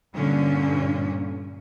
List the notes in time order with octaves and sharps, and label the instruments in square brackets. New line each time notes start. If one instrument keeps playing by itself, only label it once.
[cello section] G2 A#2 D3 C#4